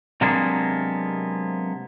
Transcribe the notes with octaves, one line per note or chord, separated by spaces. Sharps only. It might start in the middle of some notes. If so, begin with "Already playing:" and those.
C3 F#3 G#3 A#3 B3 D4